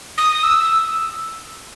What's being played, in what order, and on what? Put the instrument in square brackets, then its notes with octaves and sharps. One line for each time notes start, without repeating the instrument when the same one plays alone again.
[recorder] D#6
E6